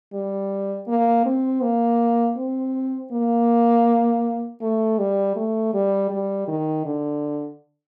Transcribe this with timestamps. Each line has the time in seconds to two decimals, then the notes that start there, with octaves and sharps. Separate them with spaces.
0.13 G3
0.88 A#3
1.26 C4
1.63 A#3
2.38 C4
3.12 A#3
4.62 A3
4.99 G3
5.36 A3
5.74 G3
6.11 G3
6.48 D#3
6.85 D3